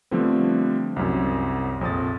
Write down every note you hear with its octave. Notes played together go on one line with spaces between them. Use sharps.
D3 F3 G3 A3 B3 C4
C2 F#2
A#1 F2 D#6 A6